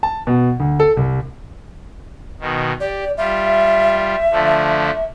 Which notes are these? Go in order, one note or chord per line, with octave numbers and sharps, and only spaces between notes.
A5
B2
D2
A4
C2
B2 D#3
G4 D5
G3 F4 E5
D3 F3 A3